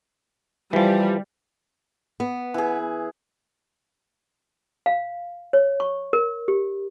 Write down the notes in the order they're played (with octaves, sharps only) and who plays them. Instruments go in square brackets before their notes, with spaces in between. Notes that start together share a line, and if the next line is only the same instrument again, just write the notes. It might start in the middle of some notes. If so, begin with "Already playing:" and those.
[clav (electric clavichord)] E3 F3 [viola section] G3
[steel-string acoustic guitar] B3
[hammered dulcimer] E3 G#4
[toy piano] F5
C#5
C#6
A#4
G4